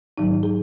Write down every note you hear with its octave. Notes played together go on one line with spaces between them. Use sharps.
G#2 D#3 F#3 D#4
G#4